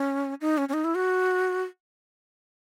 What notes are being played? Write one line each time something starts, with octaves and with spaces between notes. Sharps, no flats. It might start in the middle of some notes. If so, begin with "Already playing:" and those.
Already playing: C#4
D#4
C#4
C#4
D#4
E4
F#4